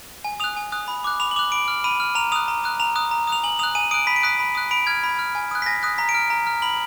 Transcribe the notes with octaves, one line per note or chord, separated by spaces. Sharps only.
G#5
D#6 F#6 F7
G#5
D#6 F#6
B5
D6 F#6
B5 F7
F#7
D6 F#6 F7
B5 D7
F6
B5 D#7
F6
A#5 F7
D#6 F#6 F7
A#5
D#6 F#6
A#5 F7
D#6 F#6
A#5
D#6 F#6 F7
G#5 F#7
D#6 F#6 F7
G#5 D#7
D#6 F#6 D7
B5 B6
D7
D#6 F#6 B6
B5
D#6 F#6
B5 D7
F6 G#6
B5
F6
G#5
D#6 F#6
B6
G#5 A#6
D#6 F#6
A#5 B6
D7
F6
A#5
F6
B5 F#7